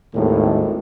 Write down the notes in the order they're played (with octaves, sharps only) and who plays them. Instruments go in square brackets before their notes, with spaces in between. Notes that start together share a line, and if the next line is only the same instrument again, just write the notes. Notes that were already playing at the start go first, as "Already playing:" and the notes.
[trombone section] G#1 D#2 A2